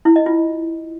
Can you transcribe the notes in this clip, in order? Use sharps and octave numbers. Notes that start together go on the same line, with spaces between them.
E4
D#5
F4